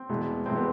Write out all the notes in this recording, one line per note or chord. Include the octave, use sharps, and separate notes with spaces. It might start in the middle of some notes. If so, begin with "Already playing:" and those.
Already playing: C4
E2 B2 G#3
E2 B2 G#3 C4
B3